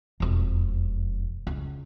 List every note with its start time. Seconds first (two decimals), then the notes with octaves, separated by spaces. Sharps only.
0.20 E1 F2
1.47 C#2